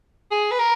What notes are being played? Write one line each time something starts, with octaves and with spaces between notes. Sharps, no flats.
G#4
B4
A#4